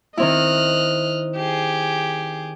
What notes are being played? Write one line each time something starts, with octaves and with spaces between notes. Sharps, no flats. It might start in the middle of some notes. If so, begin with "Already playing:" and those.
D#3 C4 E4 D#5 F6 F#6
G4 G#4